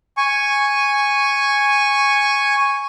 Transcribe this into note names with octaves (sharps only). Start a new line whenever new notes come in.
G#5 C#6